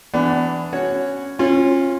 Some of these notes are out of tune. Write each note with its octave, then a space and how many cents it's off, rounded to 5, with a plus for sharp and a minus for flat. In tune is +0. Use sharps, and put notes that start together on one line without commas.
E3 +10 B3 +30 D4 +0
C#4 +0 F#4 +0 C#5 +0
C#4 -30 F4 +0